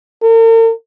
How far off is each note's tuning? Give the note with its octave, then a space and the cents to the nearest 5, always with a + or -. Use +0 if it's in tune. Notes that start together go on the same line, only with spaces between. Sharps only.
A#4 -45